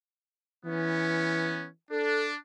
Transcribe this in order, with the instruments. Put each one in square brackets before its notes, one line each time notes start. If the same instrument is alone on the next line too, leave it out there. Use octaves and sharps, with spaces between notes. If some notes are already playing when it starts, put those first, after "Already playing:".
[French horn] E3 [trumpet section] B3 C#4
[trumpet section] D4 [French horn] A4